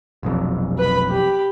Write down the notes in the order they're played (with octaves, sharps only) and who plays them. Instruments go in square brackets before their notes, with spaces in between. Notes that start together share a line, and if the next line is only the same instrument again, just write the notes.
[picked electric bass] F1 B1 F2
[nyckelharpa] B4 B5
G4 B5